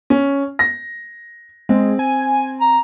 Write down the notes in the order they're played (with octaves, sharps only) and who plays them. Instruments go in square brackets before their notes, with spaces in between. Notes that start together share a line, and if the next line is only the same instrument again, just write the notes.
[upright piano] C#4
A#6
[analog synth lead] G#3 [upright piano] C4
[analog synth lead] G#5
[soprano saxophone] A#5